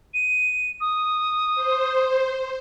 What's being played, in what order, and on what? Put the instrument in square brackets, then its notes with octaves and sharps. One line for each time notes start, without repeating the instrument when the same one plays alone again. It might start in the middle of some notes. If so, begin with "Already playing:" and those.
[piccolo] D#7
D#6
[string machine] C5